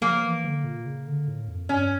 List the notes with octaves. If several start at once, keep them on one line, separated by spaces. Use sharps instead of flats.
F3 A#3
E3
D3
A#2
C#3
D3
A2
F2
G2 C#4